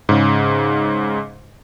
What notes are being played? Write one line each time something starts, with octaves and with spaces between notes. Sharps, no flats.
G#2 C#3